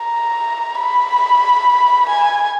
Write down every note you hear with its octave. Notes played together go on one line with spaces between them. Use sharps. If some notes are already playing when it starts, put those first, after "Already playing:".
Already playing: A#5
B5
G#5